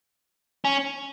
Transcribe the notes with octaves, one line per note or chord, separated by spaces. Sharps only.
C#4